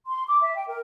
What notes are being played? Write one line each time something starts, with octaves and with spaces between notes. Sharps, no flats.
C6
D6
E5
G5
A#4